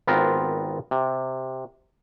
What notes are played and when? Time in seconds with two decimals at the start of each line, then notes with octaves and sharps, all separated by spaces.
0.07 G#1 B3 C4 F4 A#4
0.91 C3